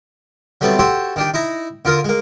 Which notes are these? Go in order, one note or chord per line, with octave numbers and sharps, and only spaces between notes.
F#3 G3 A3 B3 C4
F#4 G4 A4 C5 C#5
D#3 D4 G4
D#4 E4 A#5
D3 F4 A#4 D#6
G#3 A#3